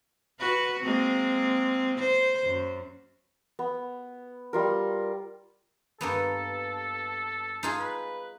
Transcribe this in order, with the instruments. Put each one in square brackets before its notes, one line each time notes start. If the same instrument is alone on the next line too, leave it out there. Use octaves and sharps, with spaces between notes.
[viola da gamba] F#4 B4
G#3 A#3 C4
C5
F#2
[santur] B3
G3 F4 A#4
[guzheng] G2 A#3 B3 [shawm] A4
[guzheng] D#4 F4 G#4
[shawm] B4